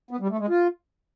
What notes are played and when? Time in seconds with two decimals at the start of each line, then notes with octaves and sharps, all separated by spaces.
0.11 B3
0.20 G3
0.30 A3
0.39 G#3
0.49 F4